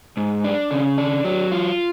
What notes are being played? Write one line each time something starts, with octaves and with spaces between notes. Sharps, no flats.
G#2
D4
C#3
D4
F#3
F4